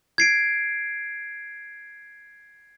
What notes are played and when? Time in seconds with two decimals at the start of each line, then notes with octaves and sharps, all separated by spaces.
0.18 G#6 C7 D7